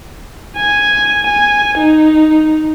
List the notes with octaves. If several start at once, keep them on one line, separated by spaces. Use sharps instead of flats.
G#5
G#5
D#4